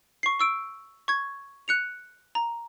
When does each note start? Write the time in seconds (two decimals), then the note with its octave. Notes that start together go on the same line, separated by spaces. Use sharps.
0.23 C#6 C7
0.40 C#6 E6 D7
1.08 C#6 G#6
1.68 F#6 C#7 F7
2.35 A#5